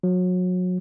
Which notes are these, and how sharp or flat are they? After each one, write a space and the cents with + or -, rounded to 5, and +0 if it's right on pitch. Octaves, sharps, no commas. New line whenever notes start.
F#3 -30